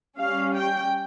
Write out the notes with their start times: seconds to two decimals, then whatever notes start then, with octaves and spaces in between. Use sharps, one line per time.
0.18 G3 C#4 F5
0.57 G5